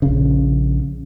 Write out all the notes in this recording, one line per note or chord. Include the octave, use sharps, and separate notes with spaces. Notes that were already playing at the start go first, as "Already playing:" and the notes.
A#1 C#3